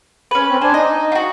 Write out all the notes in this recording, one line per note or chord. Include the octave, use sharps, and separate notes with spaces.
C#4 B4
C4
D4 C5 G#5
D#4 D#5
F4 F#4